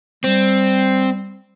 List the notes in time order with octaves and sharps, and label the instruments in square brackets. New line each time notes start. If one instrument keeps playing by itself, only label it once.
[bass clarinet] G3 [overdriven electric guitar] C4